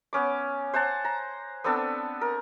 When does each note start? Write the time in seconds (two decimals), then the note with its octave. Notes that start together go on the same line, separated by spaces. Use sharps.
0.13 B3 C#4 D6
0.74 C5 F#5 G#5 A5
1.05 A#5
1.64 B3 C4 D4 A4
2.21 A#4